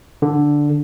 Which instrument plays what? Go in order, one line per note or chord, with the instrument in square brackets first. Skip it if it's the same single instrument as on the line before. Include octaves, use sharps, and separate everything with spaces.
[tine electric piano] D3